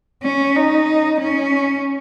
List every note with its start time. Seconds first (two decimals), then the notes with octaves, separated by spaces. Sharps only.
0.23 C#4
0.56 D#4
1.21 C#4